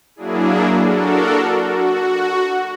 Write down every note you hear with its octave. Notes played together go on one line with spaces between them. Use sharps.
F#3 A#3 D4 E4 G#4
D4 F#4 A4 A#4
F#4